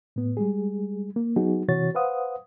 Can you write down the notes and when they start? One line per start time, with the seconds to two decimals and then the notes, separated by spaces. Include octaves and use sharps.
0.16 A2 B3
0.37 G3 G#3 G#4
1.16 A#3
1.36 F#3 B3 D#4 F#4 G#4
1.68 C3 E3 F#4 C#5 A6
1.95 B4 C5 F5 F#5 D#6